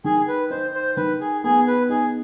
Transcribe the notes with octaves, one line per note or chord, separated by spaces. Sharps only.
D#3 G#4
B4
D#4 C5
C5
D#3 B4
G#4
B3 G#4
B4
D#4 G#4